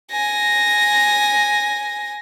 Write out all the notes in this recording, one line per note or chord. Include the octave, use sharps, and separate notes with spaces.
G#5 A#6